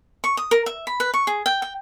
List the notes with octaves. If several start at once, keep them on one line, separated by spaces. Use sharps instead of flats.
C#6
D#6
A#4
E5
B5
B4
C#6
G#4
G5
G5